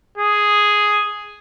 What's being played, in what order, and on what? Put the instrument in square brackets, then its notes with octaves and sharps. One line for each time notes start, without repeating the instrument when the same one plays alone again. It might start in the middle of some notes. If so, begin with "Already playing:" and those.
[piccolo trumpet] G#4